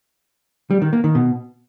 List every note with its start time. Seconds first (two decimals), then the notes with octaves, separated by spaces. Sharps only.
0.71 G3
0.82 D#3
0.93 A#3
1.04 D#3
1.15 B2